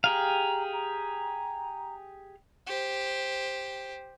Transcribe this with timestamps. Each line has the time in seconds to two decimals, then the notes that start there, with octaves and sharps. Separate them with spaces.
0.04 G4 G#4 F5 A#5
0.73 A#5
2.67 G4 C5